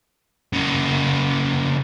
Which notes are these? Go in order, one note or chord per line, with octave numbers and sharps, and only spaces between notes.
C#3 A#3